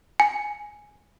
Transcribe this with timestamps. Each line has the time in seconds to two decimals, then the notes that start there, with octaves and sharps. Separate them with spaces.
0.20 G#5